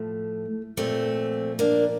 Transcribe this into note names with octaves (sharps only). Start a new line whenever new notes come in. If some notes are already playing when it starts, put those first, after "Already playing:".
Already playing: A2 F3 A3
A#2 F3 A3 C4
A#3 D4